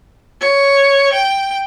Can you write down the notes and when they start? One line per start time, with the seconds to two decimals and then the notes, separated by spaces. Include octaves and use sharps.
0.41 C#5
1.13 G5